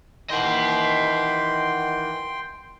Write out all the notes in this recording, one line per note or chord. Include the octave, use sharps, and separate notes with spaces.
D#3 E3 D#5 F#5 G5 C6